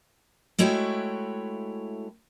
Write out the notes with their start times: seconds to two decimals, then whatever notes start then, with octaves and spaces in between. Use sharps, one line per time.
0.59 G#3 A3 E4 F#4 C#5 G5